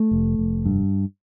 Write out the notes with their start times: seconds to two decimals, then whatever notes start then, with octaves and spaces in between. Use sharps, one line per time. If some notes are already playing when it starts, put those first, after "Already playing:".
Already playing: A3
0.11 F1
0.39 F1
0.65 G2